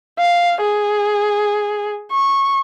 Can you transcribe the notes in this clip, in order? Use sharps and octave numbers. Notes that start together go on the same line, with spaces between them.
F5
G#4
C#6